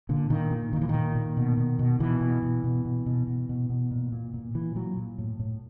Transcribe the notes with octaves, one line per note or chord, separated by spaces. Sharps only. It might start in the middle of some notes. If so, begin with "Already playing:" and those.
A#2 D3
A#2 D#3
A#2
A#2 D#3
E3
D#3
A#2
A#2
B2
B2
B2
B2 E3
B2
B2
B2
B2
B2
B2
B2
B2
A#2
A#2
A#2
A#2 E3
A#2 F#3
A#2
A2
A2